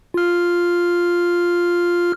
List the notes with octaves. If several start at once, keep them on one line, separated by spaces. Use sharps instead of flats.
F4 F6